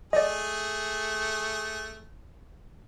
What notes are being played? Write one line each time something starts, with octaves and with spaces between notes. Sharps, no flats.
A3 G#4 D5 D#5